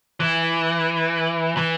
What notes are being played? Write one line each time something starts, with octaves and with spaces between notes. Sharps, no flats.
E3
E3